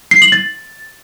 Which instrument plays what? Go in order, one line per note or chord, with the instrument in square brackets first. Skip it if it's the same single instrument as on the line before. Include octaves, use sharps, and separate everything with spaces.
[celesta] C7
F#7
A6